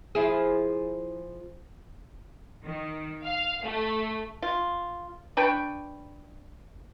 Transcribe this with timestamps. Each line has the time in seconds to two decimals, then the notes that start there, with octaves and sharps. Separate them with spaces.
0.15 F3 E4 G#4
2.64 D#3
3.24 F5
3.64 A3
4.42 F4
5.37 D4 B4 G5 C#6